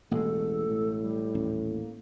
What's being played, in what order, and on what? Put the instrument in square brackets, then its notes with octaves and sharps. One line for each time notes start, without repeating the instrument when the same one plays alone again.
[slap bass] A1 B2 G#3 [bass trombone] E2 [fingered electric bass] A#3 [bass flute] A4
[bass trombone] A2
[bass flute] G3
[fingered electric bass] D#1 A1 C#4
[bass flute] A#3